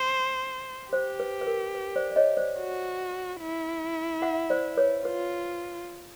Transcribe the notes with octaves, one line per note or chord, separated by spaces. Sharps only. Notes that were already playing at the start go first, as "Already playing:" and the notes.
Already playing: C5
G4 C5
B4
B4
A#4
B4
C5 D5
D5
C#5 D#5
C5 D5
F#4
E4
E5 F#5
C5 D5
B4 C#5
F4 B4